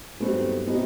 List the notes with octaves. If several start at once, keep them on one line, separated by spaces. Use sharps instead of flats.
G2 F#3 A3 B3 C4 D#4
B2 G3 B3 C4 D#4 E4